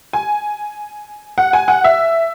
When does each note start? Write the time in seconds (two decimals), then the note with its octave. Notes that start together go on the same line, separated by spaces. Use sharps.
0.13 G#5
1.38 F#5
1.53 G#5
1.68 F#5
1.84 E5